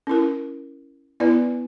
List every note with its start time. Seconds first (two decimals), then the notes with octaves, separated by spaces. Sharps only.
0.07 C#4 E4 A#4
1.20 B3 E4 B4 D5